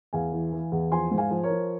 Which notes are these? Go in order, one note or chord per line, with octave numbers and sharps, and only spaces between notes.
E2 F5 G#5
E3
E3
E2
F3 G#5 C6
G#2
F5 G#5
F3
A#4 C#5
F3